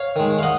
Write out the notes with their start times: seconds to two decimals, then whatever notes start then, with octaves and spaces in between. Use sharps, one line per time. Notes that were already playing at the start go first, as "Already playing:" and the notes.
Already playing: C#5 F5
0.16 D#3 G#3
0.39 F5
0.43 D#5 F#5